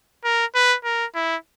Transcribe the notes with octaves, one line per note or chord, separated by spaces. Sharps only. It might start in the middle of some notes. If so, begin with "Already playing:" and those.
A#4
B4
A#4
E4